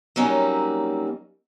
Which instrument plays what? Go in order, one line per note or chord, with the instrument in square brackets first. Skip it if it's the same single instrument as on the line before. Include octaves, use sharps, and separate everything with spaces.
[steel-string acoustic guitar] F#3 G3 A#3 C4 C#4 D#4